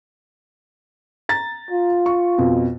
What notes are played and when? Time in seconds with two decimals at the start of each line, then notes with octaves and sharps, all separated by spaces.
1.29 A#5 A6
1.71 F4
2.06 C#6
2.38 F2 B2